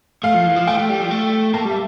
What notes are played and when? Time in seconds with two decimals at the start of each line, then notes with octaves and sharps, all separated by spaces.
0.23 A3 F5
0.34 F3
0.46 E3
0.56 F3
0.67 A3 G5
0.79 A3
0.89 G3
1.00 F3
1.11 A3
1.54 A#3 A5
1.65 G3 E5